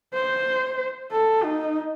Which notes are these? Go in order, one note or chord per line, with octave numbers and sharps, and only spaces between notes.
C5
A4
D#4